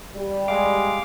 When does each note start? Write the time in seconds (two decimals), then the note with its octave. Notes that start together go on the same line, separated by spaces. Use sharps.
0.16 G3
0.48 G#3 F5 D6